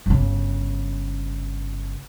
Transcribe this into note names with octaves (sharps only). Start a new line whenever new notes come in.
G1 C#3